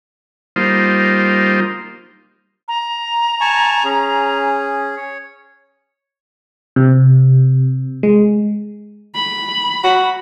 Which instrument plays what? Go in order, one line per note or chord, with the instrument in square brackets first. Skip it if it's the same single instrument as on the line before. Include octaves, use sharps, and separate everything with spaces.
[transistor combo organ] G3 A#3 D#4 F4 C5
[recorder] A#5
[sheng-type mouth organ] G#5 A5 C#6
C#4 G#4
C#5
[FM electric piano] C3
G#3
[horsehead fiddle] B5
[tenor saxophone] F#4